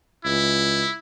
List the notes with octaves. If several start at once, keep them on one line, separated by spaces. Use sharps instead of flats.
C#2 E4